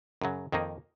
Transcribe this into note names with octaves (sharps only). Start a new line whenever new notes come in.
F#2 C#3 F#3
F2 D#3 A#3 D#4